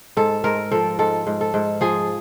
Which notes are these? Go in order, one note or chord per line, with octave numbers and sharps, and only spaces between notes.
G#2 A4
G#2 A#4
F3 A4
G#2 A4
G#2
A4
G#2
F3 G#4